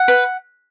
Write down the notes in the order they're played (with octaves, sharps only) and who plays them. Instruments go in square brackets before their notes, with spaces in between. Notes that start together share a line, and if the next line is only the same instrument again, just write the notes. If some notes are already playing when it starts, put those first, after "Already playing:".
Already playing: [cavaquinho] F#5
B4